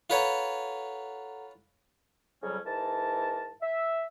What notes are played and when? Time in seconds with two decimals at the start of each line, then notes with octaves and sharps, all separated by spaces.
0.10 F4 A4 B4 C#5 F#5 A#5
2.43 F2 C#3 F#3 G3 C#4
2.65 G#2 E3 A#4 A5
3.62 E5